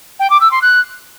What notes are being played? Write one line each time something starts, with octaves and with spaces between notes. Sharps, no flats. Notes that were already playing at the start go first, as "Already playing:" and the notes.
G5
D6
E6
C6
F#6